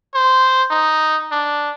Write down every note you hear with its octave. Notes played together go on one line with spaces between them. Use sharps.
C5
D#4
D4